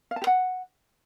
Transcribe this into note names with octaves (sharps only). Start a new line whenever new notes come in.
F5
A5
G4
F#5